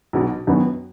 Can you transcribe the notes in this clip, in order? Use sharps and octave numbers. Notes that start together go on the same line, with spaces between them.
B1 B2 F#3
F#2 D#3 F#3 B3 F#4